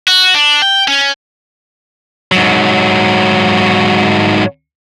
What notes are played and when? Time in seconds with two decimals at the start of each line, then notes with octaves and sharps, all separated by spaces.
0.08 F#4
0.34 D4
0.62 G5
0.88 C#4
2.32 G#2 F#3